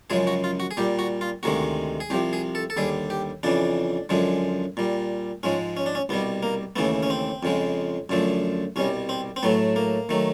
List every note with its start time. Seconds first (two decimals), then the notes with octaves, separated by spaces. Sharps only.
0.10 F#2 C#3 F3 G#3 G#4
0.27 F#4
0.44 F4
0.60 F#4
0.71 G#4
0.77 A#2 G3 G4
0.99 F#4
1.21 F4
1.43 D2 C3 D#3 G#3 F#4
2.00 G#4
2.10 C2 C3 F3 G4
2.33 G#4
2.55 A4
2.70 A4
2.77 D#2 D3 G3 G#4
3.10 G4
3.43 F2 C#3 E3 D4
4.09 F#2 D3 F3 G#3
4.77 A#2 G3
5.43 G#2 F3 G#3 C#4
5.77 C#4
5.86 D4
5.95 C#4
6.09 C2 B2 G3 B3
6.43 A#3
6.76 D#2 C#3 E3 A3 B3
7.03 C#4
7.10 C4
7.43 F2 C#3 F3 G#3
8.09 F#2 D3 F3 A3
8.76 C2 B2 G3 C#4
9.09 C4
9.36 C4
9.43 A2 F#3 A3 B3
9.76 A#3
10.09 D#3 F#3 A3